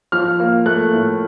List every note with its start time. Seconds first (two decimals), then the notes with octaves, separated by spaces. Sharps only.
0.12 F3 F6
0.40 A#3
0.66 A3 F#6
0.93 A2